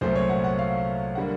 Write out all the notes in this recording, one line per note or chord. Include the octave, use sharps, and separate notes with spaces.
C2 A#2 F#3 A3 C5
C#5
F#5
F#5
F5
D3 G3 A#3 F#5